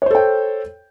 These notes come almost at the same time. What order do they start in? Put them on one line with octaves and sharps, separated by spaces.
C#5 C5 A4 G5